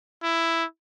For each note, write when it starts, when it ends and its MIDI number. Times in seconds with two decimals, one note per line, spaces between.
0.23 0.64 64